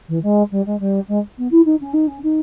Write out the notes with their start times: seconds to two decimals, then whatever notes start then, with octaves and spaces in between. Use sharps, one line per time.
0.08 E3
0.22 G#3
0.51 G3
0.66 G#3
0.79 G3
1.08 G#3
1.37 B3
1.51 E4
1.65 D#4
1.80 C#4
1.93 D#4
2.07 C#4
2.23 D#4